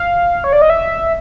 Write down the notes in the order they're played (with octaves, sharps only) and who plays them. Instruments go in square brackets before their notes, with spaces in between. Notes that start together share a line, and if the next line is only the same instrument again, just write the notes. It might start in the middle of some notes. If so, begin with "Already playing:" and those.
Already playing: [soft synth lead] F5
C#5
D5
D#5
E5